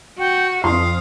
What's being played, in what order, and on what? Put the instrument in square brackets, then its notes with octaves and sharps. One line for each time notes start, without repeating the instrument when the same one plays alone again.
[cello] F#4 [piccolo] G5
[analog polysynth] F2 [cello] F5 [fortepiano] C6 [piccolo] D#6